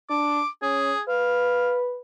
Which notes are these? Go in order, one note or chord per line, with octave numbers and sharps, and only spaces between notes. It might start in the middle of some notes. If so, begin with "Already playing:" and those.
D4 D6
C#4 G#4
B4 F5